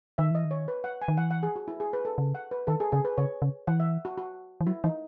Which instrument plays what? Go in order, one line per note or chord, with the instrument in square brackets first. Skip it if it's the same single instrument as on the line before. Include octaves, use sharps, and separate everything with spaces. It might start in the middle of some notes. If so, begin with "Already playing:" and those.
[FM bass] D#3 [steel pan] E5
[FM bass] E3 [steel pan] D#5
[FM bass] D#3
[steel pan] C#5
B4
F#5
G#5
[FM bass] D#3
[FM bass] E3 [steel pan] F#5
[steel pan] F#5
G#4
F#4
E4
G#4
B4
A4
[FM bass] C#3
[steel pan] F#5
B4
[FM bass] D#3 [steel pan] A4
[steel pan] G#4
[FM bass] C#3 [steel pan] G#4
[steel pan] B4
[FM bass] C#3 [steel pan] C#5
[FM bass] C#3
[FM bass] E3 [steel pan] F#5
[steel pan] E5
F#4
F#4
[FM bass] E3
[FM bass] F#3 [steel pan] E4
[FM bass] E3 [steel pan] D#4